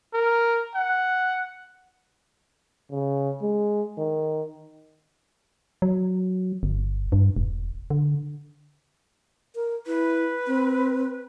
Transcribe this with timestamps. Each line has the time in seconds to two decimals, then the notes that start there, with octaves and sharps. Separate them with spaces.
0.13 A#4
0.75 F#5
2.91 C#3
3.42 G#3
3.98 D#3
5.82 F#3
6.63 G1
7.12 G2
7.36 E1
7.90 D3
9.55 A#4
9.87 E4 B4
10.47 C4